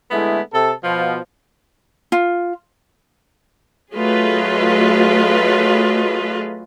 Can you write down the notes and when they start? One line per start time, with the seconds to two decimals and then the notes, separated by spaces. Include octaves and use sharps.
0.11 D3 G#3 A3 B3 E4
0.54 C3 A4
0.84 B2 F3
2.12 F4
3.93 F#3 A3 F4 G#4 B4 D#5